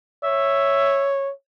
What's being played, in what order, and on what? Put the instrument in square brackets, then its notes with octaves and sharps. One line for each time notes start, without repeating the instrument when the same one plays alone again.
[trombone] C#5 [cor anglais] E5